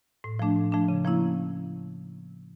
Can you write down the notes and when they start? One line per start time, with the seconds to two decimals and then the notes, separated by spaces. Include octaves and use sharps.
0.24 A2
0.39 F3 A3 D4
0.56 A2
0.72 F3 A3 D4
0.89 C#3
1.05 F3 A#3 C#4 E4